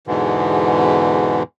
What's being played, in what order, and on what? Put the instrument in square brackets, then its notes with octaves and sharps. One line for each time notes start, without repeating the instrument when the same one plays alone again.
[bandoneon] E2 G#2 B2 D3 E3